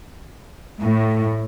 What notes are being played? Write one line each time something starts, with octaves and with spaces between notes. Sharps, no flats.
A2